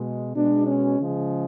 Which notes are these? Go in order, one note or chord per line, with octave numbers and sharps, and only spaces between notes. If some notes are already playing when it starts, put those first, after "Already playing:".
Already playing: B2 G#3
B2 G#3 D4
C#4
C#3 F3 G#3